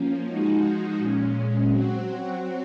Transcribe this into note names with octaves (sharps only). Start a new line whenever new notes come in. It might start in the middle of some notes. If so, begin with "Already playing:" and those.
Already playing: F3 A#3 C#4
F3 G#3 D#4 F#4
A#2 G#3 C#4
F#3 C4 F#4